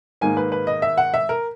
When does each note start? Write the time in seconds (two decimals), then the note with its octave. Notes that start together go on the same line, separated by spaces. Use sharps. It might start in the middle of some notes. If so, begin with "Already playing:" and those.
0.21 G#2 D#3 A#3 D#4 G#5
0.37 B4
0.52 B4
0.67 D#5
0.82 E5
0.98 F#5
1.14 E5
1.29 A#4